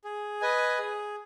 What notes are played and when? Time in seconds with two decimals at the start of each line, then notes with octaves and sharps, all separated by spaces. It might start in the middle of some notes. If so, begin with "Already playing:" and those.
0.04 G#4
0.41 B4 D#5 G#5
0.78 G#4